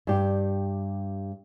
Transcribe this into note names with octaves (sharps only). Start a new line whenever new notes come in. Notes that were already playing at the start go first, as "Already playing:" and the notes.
G2 G4